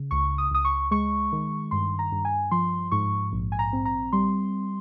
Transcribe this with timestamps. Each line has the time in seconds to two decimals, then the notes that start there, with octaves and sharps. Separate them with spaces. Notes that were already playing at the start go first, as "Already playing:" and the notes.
Already playing: C#3
0.11 C#2 C#6
0.38 D#6
0.51 C#2 D#6
0.65 C#6
0.91 G#3 C#6
1.32 D#3
1.71 G2 C6
1.99 A#5
2.12 G2
2.25 G#5
2.51 F3 C6
2.92 G#2 C#6
3.32 A#1
3.52 G#5
3.59 A#5
3.73 C4
3.85 A#5
4.13 G3 C6